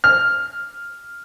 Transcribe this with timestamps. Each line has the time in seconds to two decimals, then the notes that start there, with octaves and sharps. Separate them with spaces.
0.04 F6